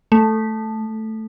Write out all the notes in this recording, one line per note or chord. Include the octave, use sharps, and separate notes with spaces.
A3